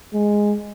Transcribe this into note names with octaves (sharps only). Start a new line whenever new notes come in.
G#3